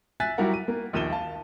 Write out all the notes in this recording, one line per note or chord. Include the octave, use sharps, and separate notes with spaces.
E5 G#5 F#6 A6 B6
F#3 G3 E4 F#4 A#4 F#5
D#7
A#3
A#1 D#2 D#7 E7 G7
F5 A5